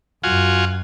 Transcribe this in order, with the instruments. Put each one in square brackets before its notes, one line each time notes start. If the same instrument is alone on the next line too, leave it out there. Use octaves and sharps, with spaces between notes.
[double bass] F#2 [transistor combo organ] F4 F#4 G#5